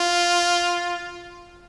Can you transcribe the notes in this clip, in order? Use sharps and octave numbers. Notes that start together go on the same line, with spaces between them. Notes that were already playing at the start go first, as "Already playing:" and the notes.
Already playing: F4